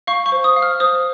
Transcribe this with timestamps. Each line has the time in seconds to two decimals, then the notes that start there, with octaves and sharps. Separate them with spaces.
0.07 F5 C#6
0.26 C#6
0.32 C5
0.44 D#6
0.56 F5
0.62 F6
0.80 C5 D#6